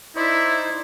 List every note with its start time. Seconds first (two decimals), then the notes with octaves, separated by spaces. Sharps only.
0.16 D#4 E4 C5 D5